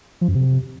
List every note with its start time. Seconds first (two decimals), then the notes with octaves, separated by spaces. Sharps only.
0.21 F3
0.28 F#2
0.35 C3